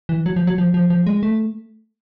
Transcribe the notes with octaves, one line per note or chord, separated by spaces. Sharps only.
E3
F#3
F3
F#3
F3
F3
F3
G#3
A3